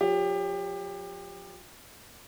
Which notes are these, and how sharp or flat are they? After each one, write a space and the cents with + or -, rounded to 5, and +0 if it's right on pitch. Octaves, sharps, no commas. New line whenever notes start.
F3 +45 G4 +25 C#5 +15